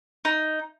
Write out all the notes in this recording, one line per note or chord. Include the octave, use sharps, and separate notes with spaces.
D#4